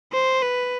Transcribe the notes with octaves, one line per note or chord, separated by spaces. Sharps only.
C5
B4